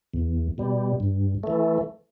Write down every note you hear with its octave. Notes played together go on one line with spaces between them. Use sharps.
E2
B2 G3
G2
E3 A3